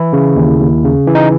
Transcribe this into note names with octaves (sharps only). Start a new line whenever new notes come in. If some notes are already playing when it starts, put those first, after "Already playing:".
Already playing: E3 E4
C#3
D#2
D#2
C#3
E3
D#4